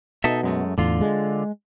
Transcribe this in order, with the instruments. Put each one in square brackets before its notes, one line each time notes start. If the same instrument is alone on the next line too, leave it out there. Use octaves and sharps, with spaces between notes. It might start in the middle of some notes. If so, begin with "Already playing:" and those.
[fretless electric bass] B2 [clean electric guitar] D#4 A4 E5
[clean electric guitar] F#2 G#3 A3
[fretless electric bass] E2 A2 [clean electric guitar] D3 F4
[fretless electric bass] G#3